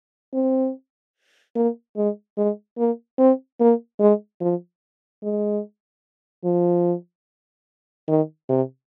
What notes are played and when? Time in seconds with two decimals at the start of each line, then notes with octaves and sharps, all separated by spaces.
0.34 C4
1.56 A#3
1.97 G#3
2.37 G#3
2.78 A#3
3.19 C4
3.60 A#3
4.00 G#3
4.41 F3
5.23 G#3
6.44 F3
8.08 D#3
8.49 C3